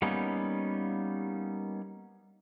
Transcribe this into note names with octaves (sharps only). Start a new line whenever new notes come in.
G3 A#3 B3 C#4 D#4